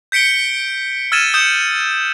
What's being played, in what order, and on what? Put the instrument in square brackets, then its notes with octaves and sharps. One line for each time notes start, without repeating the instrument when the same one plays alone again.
[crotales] G6 B6 C#7 D7 G7
E6 F6 G#6 A6 D#7 E7
D#6 G6 C#7 E7